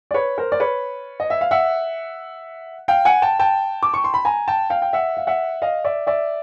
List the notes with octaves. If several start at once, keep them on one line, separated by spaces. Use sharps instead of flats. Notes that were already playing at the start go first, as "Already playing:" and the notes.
D5
B4 C#5
A#4 C5
D5
B4 C#5
D#5
E5
F5
E5 F#5
F5 G5
F#5 G#5
G5 A5
G5 A5
D6
C#6
C6
B5
G#5 A#5
G5 A5
F5 G5
G5
E5 F#5
F5
E5 F#5
D#5 F5
D5 E5
D5 E5